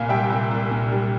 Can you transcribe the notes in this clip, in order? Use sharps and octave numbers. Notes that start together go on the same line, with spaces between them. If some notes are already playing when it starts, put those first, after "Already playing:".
Already playing: C2 A#2 F5 G#5
G3 E5 G5
C2
C2
A#2
G3